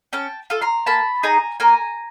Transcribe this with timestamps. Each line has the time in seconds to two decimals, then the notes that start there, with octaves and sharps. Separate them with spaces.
0.13 C#4 G5 A5
0.50 F4 A4
0.61 A#5 C6
0.86 A#3 A5 B5
1.23 D#4 G#4 G#5 A#5
1.60 A#3 G#5 A#5